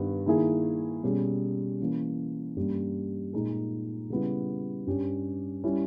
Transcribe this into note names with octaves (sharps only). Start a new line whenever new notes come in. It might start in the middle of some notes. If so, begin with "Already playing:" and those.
Already playing: G2 D#3 G3 B3
D#3 A#3 E4 G#4
B2 G3 C#4 G#4
E3 A#3 C#4
G2 G3 A#3 C#4
A#2 G#3 D#4 G#4
C#3 G3 B3 E4
G2 G3 C#4 G4
G3 C#4 E4